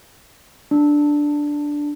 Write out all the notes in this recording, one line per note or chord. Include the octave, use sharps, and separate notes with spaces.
D4